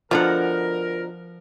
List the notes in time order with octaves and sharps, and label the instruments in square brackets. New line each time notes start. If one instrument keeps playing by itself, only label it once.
[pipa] B2 D3 [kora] F3 F#5 [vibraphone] F4 C5 [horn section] A#4